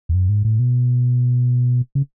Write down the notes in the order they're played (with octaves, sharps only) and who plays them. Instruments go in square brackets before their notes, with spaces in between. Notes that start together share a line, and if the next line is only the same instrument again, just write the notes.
[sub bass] E2
F#2
G#2
A2
B2
C#3